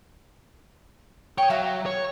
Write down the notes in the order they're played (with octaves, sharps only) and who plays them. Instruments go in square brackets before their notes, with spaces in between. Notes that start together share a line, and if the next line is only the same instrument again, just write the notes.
[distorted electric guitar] C#5 [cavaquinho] G5 D#6
[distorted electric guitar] F#3 [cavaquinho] E5 F5
[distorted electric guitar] C#5